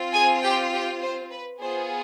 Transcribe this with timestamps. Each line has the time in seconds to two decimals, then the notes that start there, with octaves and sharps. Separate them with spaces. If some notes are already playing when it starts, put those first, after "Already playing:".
Already playing: C4 F4
0.13 G#4 G#5
0.43 G4 G5
0.72 G4 G5
1.02 C5
1.31 B4
1.60 B3 F4 G#4 C5